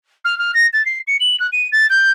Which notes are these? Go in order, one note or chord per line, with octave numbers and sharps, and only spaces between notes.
F6
F6
A#6
A6
C7
C#7
F#7
F#6
D#7
A6
G6